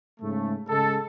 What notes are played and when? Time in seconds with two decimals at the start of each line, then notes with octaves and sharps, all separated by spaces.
0.20 G#2 C#3 A3
0.68 C#3 G#3 A4